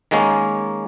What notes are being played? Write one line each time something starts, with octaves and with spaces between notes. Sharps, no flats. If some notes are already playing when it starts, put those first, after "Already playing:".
D#3 G#3 A#3 C#4